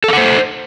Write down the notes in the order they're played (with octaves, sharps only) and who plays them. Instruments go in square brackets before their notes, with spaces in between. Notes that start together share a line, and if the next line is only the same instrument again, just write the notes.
[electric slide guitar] A4
F5
F#5
C5